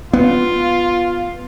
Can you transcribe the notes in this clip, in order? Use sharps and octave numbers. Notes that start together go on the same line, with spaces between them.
B3 F4